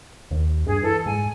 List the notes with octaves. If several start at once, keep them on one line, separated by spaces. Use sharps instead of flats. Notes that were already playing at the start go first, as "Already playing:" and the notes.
D#2
G2 G#4
E3 A4
G#2 G#5